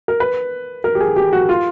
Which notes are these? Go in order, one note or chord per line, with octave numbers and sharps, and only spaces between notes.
A#4
B4
A#4
G4
G#4
G4
F#4
F4